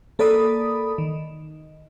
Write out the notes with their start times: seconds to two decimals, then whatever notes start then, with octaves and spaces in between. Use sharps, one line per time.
0.19 A#3 A4 D5 B5 D#6
0.98 D#3